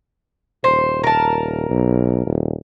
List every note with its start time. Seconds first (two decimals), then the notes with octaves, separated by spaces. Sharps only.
0.64 D#1 C5
1.04 A#4 A5
1.70 B1
2.26 D#1